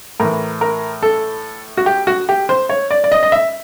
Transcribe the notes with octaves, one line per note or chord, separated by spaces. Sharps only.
A2 E3 A#4
A#4
A4
F#4
G4
F#4
G4
C5
C#5
D5
D5
D#5
D#5
E5